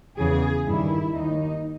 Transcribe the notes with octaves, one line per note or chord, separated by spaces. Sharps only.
E2 C#3 E3 G#4
G2 D#3 E4
D#2 D#3 D#4